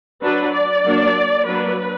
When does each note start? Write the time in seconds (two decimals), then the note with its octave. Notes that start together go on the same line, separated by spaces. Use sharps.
0.22 F#3 D4 B4
0.53 D5
0.85 F#3 A#3 D4
1.47 F#3 A#3 D4 B4